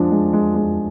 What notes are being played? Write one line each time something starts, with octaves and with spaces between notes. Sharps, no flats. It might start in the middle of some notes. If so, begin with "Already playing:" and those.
Already playing: F3 G#3 D4
G#3
G#3
G#3